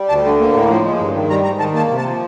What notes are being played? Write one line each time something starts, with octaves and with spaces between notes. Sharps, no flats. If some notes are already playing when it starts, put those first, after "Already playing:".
Already playing: G3
D2 A5
D3
A#3
A2
F3
G#3
G2
D#3
G3 A#5
G#2 A#5
D#3 A5
A#3 A5
C3
A5
F3